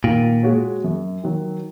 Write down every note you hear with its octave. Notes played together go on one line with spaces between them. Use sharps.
A#2 D#3
G#3 F#4 C#5
F#2
D#3 F#3